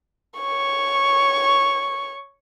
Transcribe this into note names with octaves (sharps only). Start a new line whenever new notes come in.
C#5 C#6